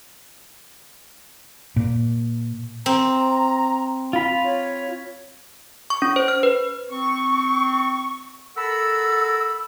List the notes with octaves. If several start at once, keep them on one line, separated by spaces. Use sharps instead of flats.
A#2
C4 A#5
F4 B5
C#5
C#6
C#4
C5
F6
B4
C4 C#6
A4 A#4 F#5 A5 B5 E6